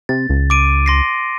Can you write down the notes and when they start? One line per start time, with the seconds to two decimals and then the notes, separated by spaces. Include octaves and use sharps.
0.09 C3 A6
0.29 C#2
0.50 D6 D7 D#7
0.86 C6 A#6 C7